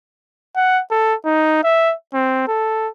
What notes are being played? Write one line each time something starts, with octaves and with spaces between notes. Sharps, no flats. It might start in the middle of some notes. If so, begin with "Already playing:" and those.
F#5
A4
D#4
E5
C4
A4